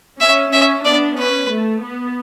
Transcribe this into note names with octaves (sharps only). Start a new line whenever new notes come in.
C#4 E5
C#4 E5
B3 D4 D5
C#4 B4
A3
B3